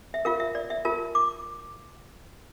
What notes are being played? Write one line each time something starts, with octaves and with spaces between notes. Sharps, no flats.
E5
F4 A#4 F5
E5
D5
E5
F4 A#4 A5
D6